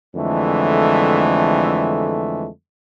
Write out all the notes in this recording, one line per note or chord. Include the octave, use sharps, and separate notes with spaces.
F2 D3 E3 G#3 A3